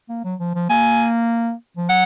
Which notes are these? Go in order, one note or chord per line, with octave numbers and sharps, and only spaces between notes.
A#3
F#3
F3
F3
A#3 G#5
F3
F#3 F#5